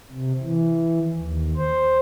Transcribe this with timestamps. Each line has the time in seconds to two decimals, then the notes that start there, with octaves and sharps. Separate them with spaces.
0.11 C3
0.42 E3
1.15 D#2
1.57 C5